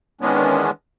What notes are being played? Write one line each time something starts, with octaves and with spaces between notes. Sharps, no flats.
D#3 E3 G#3 B3 C#4 D4